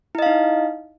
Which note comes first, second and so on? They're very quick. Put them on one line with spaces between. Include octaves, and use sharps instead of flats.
E4 D#5 F5 D#4